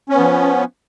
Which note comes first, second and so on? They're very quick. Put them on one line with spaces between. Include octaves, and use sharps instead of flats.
C#4 B3 F3